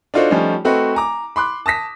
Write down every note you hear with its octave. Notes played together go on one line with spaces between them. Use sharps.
D4 D#4 F4 F#4 A4 C5
F3 G3 A3 C#4 D#4
A3 C4 F#4 A4 B4 D#5
G#5 A#5 D6
B5 C6 D6 F#6
A5 D#6 A#6 B6